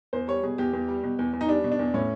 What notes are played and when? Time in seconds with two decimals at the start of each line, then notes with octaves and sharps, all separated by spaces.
0.13 E2 C5
0.28 G3 C#5
0.43 B2 G#4
0.58 E2 G4
0.73 E2
0.88 G3
1.03 B2
1.19 E2
1.33 E2
1.41 D#4
1.49 G3 D4
1.64 B2
1.72 D4
1.79 E2
1.94 A2 C#4